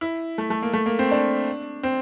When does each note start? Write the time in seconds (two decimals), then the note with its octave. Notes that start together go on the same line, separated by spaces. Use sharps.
0.01 E4
0.38 A3
0.50 A3
0.62 A#3
0.73 A3
0.86 A#3
0.99 C4
1.11 D4
1.83 C4